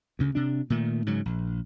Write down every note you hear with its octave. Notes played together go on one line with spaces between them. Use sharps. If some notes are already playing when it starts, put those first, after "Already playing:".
D2 C#3
C3 D4
A#2 D#3 A3
G#2 C#3 F#3
A#1